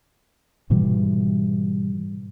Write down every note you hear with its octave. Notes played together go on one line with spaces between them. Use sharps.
G#2 B2 E3 G3